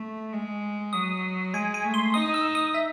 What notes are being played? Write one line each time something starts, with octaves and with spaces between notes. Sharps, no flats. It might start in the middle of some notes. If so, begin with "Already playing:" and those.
Already playing: A3
G#3
F#3 D#6
G#3 G#5
G#5
A3
C6
D#4 D#6
E6
D#6
E5